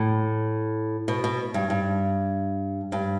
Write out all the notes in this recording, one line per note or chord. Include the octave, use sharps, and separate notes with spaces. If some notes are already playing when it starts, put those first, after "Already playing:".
Already playing: A2
B2
B2
G2
G2
G2